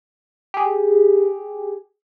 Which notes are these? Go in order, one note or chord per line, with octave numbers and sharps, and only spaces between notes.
G4 G#4